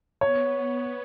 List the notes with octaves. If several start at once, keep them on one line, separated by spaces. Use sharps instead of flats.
B3 C#5